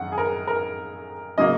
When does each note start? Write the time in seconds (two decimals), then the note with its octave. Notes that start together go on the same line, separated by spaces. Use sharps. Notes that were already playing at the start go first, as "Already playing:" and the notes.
Already playing: F#2 D#3 F#5
0.12 G#4
0.18 A#4
0.48 A#4
1.38 C#3 F#3 A#3 D#5